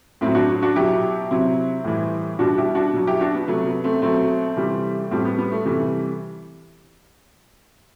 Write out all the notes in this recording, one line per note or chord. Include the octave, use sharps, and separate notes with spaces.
A2 F#3 C4 E4
D4 F#4
D4 F#4
B2 F#3 E4 G4
C3 F#3 C4 E4
A2 E3 G3
B2 G3 D4 F#4
E4 G4
D4 F#4
B2 F#3
E4 G4
D4 F#4
B3
C3 F#3 A3
B3
A3 C4
B2 F#3 A3 C4
C3 E3 G3
A2 G3 A3 C4
B3
B3
A3
C3 E3 G3 A3